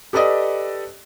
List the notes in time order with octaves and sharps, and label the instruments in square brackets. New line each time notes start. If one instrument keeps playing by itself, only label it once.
[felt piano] G4 A4 B4 D5 D#5 D#6